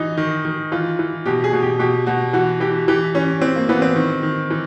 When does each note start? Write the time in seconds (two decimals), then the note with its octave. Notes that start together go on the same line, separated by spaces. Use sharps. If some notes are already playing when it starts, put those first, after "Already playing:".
Already playing: E3 D#4
0.17 D#3
0.45 D#3
0.72 E3 F4
0.99 E3
1.26 B2 G4
1.44 G#4
1.53 B2
1.62 G4
1.79 B2 G4
2.06 B2 F#4
2.33 E3 F#4
2.60 E3 G4
2.88 E3 G4
3.15 E3 C#4
3.41 E3 C4
3.56 A#3
3.69 E3 B3
3.82 C4
3.96 D#3
4.23 D#3
4.50 E3